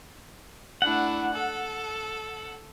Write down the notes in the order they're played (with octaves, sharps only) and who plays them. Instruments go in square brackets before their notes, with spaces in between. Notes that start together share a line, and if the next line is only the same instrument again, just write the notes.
[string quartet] A3 D4 E4 [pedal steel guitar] F#5
[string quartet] A4